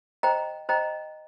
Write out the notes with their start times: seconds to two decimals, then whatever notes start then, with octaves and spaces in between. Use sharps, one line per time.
0.23 C5 D#5 G5 A#5
0.69 C5 D#5 G5 A#5